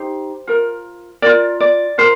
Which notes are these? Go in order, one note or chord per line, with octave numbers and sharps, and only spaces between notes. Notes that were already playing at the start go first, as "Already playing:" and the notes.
Already playing: D#4 G4 C5
F4 A#4
F4 A#4 D5
D5
F4 A#4 C5